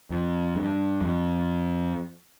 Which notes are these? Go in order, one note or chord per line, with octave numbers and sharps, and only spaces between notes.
F2
G2
F2